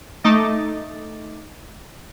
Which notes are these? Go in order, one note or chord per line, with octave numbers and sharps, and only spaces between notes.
A3 D#4 D#5 D6 A6